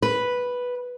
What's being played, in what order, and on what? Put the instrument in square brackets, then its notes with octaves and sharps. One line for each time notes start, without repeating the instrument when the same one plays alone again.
[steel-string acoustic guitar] B4